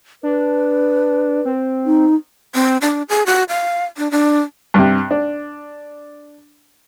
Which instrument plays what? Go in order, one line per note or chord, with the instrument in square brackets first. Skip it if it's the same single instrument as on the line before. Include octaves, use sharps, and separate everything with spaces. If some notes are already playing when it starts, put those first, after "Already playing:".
[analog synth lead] D4 [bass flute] B4
[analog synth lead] C4
[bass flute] D#4
[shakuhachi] C4
D4
G#4
F#4
F5
D4
D4
[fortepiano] G2 C3
D4